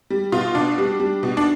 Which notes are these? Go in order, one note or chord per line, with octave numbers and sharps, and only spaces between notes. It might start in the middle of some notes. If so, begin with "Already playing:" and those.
G3
B2 F4
B2 D4
G3
G3
B2
D4